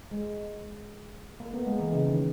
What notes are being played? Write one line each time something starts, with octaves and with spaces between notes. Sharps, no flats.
G#3
A#3
B3
G#3
E3
C#3
D#3